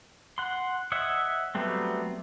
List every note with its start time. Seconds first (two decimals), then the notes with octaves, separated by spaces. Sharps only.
0.38 F#5 C6
0.92 C#5 D#5 E5 F#5
1.55 F#3 G3 A3 B3 C4